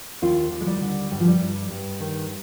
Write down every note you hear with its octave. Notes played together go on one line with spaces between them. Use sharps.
D#2 F4
D#2
G#3
G3
D3
G2 G3
F3
G3
G2
G2
D#3